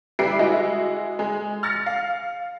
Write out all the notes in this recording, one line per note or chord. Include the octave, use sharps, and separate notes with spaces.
G3 B4 E5 C7 D7
G#3 E4 F#4 D#5
G#3
F6 A6 A#6 C#7
F5